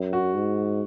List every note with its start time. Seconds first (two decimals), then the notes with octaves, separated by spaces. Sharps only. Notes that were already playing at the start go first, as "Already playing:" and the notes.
Already playing: F#2
0.13 F#4
0.35 G#2